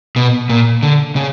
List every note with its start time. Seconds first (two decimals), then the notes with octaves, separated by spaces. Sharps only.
0.16 B2
0.49 A#2
0.83 D3
1.16 C#3